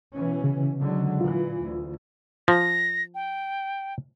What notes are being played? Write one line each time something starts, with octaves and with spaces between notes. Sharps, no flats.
B2 E3 C#4
C#3
D3 F#3 G#3
A#2 E3 F4
D2
F3 A#6
G5